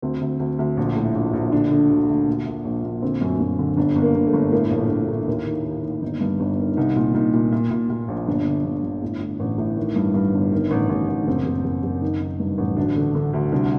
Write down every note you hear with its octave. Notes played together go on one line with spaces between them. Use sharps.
D2 C4
D2
D2
D2
A#1
A2
A#1
A#1
D3 D4
D3
D2
D2
A#2
A#2
A#1
A#2
D3 C4
F#2
F#2
D3
G1 D4
G1
A#3
G1
A3
G1
A2 A#3
A#1
A3
A#1
A#3
A2
D#2 A#3
D#3
D#2
D#2
G1 D#4
G2
G1
D#3
C2 D#4
A#2
A#2 D#4
A#2
A#2
A#2
A#2
A#1
G1 D4
D3
G1
G1
A2
A2
A1
A2
D#3
G2
G2
G1
D#3
A1
A1
A1
D4
F#1 C4
F#1
F#1
F#1
D#3 D#4
D#3
G2
A1
D2 D4
D3
D3
D2
C2 D4